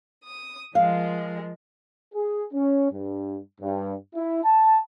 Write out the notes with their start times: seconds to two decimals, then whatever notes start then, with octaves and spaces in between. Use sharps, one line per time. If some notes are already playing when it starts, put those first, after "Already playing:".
0.24 D#6
0.75 F3 G#3 A#4 F5
2.14 G#4
2.53 C#4
2.91 G2
3.61 G2
4.15 E4
4.44 A5